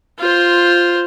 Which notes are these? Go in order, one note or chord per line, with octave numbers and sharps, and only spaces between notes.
F4 C5